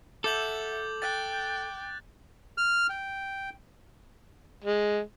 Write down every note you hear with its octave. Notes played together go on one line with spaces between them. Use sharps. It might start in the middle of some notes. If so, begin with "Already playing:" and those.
A4 E5 F#5 D6 G6 F#7
G5 F#6 A6
F6
G5
G#3